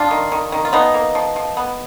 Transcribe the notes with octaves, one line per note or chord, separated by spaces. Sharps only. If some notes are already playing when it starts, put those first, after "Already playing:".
Already playing: D4 F4
D#3
D#3
D#3
F4
F3 B3 D#4
A#3
F3
F3
B3